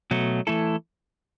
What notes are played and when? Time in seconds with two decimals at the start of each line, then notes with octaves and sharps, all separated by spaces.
0.11 B2 F#3 A3
0.47 E3 A3 E4 A4